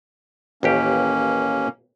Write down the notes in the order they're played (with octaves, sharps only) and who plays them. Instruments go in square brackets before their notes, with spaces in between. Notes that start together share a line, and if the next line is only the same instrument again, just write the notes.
[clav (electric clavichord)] A1 D#2 G4 [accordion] A#3 C#4